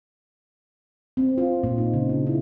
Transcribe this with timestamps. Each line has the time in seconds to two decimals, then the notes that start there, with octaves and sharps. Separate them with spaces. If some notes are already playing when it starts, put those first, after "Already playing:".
1.17 C4
1.38 F4
1.63 A#2
1.78 D#4
1.93 C#3
2.09 D4
2.27 E4